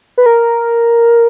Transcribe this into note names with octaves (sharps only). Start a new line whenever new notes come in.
B4
A#4